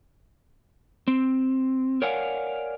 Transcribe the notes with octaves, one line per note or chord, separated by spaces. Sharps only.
C4
A#4 C#5 D5 F5 F#5 G#5